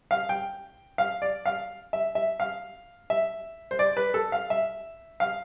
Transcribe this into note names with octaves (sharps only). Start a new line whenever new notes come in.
F5
G5
F5
D5
F5
E5
E5
F5
E5
C5
D5
B4
A4
F5
E5
F5